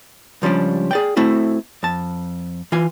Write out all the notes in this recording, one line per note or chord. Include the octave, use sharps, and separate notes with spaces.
C#2 F3 G3 C#4 D4
G#4 D5 G5
A3 C4 E4 F#4
F2 A5
E3 F4 G#5